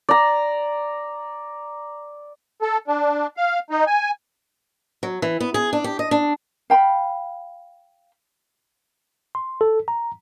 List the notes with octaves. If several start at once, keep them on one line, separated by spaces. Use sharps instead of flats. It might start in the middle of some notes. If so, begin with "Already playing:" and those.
D5 A#5
A4
D4
F5
D#4
G#5
F#3
E3
B3
G#4
D4
G4
D#5
D4
F5 G5 A#5 B5
C6
A4
A#5